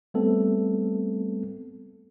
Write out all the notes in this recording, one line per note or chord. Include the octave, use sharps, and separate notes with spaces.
G3 A3 B3 C4 A4